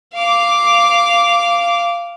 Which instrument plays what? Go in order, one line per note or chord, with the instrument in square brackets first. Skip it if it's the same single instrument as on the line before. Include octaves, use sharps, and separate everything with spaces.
[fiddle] F5 D6